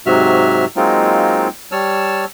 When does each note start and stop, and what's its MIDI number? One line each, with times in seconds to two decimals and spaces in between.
0.06 0.65 44
0.06 0.65 48
0.06 0.65 54
0.06 0.65 66
0.06 0.65 76
0.06 0.65 89
0.76 1.48 54
0.76 1.48 56
0.76 1.48 58
0.76 1.48 60
0.76 1.48 63
0.76 1.48 65
1.72 2.25 55
1.72 2.25 73
1.72 2.25 81
1.72 2.25 88
1.72 2.25 89